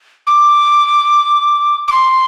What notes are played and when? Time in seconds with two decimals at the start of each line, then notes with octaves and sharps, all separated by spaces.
0.27 D6
1.88 D6
1.92 C6